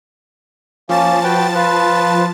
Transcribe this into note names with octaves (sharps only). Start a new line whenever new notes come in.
F3 A#3 C#4 A5 A6
F#4 B4 G5
F4 B4